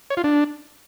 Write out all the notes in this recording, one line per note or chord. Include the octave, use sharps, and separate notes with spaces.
C#5
F4
D4